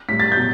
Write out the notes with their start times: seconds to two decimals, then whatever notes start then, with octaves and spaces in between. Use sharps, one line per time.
0.08 A2 G3 B6
0.20 A6
0.32 G6
0.37 B2 F#3